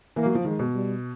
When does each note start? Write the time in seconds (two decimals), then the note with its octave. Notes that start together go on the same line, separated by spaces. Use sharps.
0.16 E3 A#3
0.26 F#3
0.35 F3
0.45 D#3 G#3
0.59 B2
0.74 G3